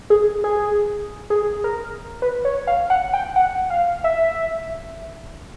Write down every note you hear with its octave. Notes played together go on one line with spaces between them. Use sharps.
G#4
G#4
G#4
A#4
B4
C#5
F5
F#5
G5
F#5
F5
E5